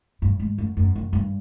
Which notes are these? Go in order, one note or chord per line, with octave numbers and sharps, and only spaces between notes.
G2
G#2
F#2
F#2
F#2
G2